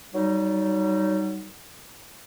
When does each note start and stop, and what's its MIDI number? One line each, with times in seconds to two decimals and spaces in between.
0.14 1.49 54
0.14 1.49 55
0.14 1.49 63